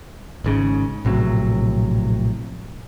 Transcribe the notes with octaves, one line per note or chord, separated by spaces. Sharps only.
G#1 G#2 C#3
A#1 A2 C3 F#3